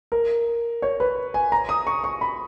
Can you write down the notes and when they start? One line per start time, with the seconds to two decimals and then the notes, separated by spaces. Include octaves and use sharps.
0.12 A#4
0.82 C#5
1.00 B4
1.34 G#5
1.52 A#5
1.69 D#6
1.87 C#6
2.04 C#6
2.21 B5